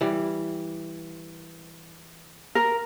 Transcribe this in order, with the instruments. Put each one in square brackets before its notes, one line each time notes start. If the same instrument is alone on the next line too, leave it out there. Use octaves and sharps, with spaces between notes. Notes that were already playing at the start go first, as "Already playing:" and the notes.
[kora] E3 G3
[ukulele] A#4